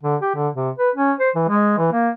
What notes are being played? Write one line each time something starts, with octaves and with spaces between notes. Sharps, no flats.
D3
G4
D3
C3
B4
C#4
C5
E3
G#3
E3
A#3